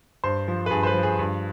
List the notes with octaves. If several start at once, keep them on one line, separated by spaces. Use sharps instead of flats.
G2 C5
F3
B4
G2 G#4
C5
B4
F3
G#4
G2